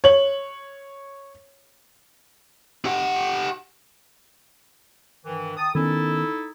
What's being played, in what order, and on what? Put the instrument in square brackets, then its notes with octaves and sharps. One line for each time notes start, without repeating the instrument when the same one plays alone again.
[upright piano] C#5 F#7
[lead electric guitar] G4 F#5
[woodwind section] G2 D#3 E3
D#3 A5 D#6
[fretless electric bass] D#3 B3 C#4 [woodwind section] D#4 E4 A4